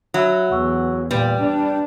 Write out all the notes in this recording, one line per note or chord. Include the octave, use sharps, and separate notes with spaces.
F#3 E5 B5 E6
E2 F#5 C#6 E6
A#2 G3 B4
D4